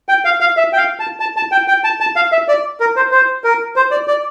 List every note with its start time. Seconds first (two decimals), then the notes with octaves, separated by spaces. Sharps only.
0.09 G5
0.25 F5
0.40 F5
0.57 E5
0.73 G5
0.77 F5
1.00 A5
1.20 A5
1.37 A5
1.52 G5
1.68 G5
1.84 A5
2.01 A5
2.16 F5
2.32 E5
2.48 D5
2.80 A#4
2.96 C5
3.12 C5
3.44 A#4
3.76 C5
3.91 D5
4.08 D5